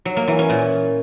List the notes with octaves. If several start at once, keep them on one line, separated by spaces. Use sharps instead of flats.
F#3
A#3
E3
C#4
A#2